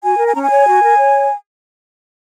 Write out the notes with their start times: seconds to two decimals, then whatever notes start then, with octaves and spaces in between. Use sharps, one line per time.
0.03 F#4 G#5
0.19 A#4
0.27 G#5
0.34 C#4 A#5
0.42 G#5
0.50 C#5
0.65 F#4
0.81 A#4
0.97 C#5